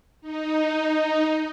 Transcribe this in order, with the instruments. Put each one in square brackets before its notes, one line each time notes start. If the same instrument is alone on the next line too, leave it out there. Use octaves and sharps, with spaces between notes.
[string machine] D#4